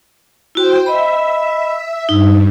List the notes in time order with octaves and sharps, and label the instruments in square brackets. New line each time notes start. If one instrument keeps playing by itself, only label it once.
[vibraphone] E4 F#4 [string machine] C5 G5
[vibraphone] D#5 B5 [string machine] E5
[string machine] G2 [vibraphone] D#4